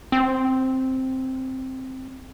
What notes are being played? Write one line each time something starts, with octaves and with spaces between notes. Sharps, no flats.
C4